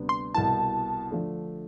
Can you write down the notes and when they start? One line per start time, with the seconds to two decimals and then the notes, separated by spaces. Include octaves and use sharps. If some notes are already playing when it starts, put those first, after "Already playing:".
Already playing: D2 C3 G3 B3 D4
0.09 C6
0.34 C2 B2 B3 E4 A5
1.11 D3 F3 A3 D4